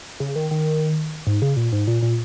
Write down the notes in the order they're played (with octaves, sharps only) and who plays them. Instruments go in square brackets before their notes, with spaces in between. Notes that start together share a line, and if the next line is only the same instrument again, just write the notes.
[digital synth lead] C#3
D#3
D#3
G#2
C#3
A#2
G#2
A#2
A#2